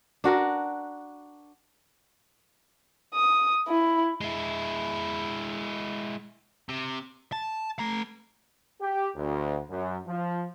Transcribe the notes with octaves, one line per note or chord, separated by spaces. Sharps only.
D4 F#4 A#4
D#6
E4
G#3 E4
C3
A5
A3 A#5
G4
D2
F#2
F3